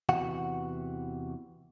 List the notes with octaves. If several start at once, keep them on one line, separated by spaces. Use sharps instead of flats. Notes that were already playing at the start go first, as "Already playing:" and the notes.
E2 C3 E3 F#4 F#5